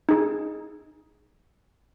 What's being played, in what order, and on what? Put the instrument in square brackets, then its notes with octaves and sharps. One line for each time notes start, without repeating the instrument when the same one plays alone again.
[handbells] D#4 G#4